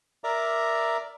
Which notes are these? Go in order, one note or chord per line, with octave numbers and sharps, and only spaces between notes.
A#4 D5 E5 A#5 D6